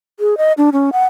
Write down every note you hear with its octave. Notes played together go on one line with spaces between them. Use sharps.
G#4
D#5
D4
C#4
F#5